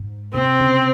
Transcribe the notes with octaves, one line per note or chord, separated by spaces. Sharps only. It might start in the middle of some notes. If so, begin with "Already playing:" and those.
Already playing: G#2
C3 C4
C#3